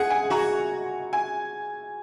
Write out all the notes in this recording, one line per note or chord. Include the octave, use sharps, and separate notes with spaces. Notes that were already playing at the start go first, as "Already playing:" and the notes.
Already playing: G#4 F#5 G#5
G#5
F#4 A#5
G#5